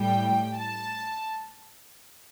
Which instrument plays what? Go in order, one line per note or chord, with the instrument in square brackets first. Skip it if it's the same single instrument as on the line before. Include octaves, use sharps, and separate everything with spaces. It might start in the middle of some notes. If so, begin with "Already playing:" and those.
Already playing: [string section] A2 G3 G5
A5